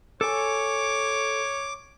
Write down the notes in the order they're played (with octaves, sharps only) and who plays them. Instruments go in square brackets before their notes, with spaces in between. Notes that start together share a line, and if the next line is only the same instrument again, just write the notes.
[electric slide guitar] A4 G#5 [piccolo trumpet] C#5 [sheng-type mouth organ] D6